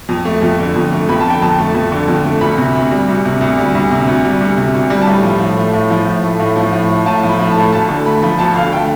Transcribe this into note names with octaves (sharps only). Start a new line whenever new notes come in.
F2
A3
F2
D3
F2
A3
F2 B5
A5
D3 G5
F2 A5
A3
F2
D3
F2
A3
D2 B5
C3
D2
G3
D2
C3
D2
G3
D2
C3
D2
G3
D2
C3
D2
G3
A5
A2 B5
F3
A2
A3
A2
F3
A2
A3
A2
F3
A2
A3
A2 A5
F3
B5
A2 B5
A5
A3
D2 A5
D3
A3 B5
F3 B5
D2 A5
D3 F5
A3 G5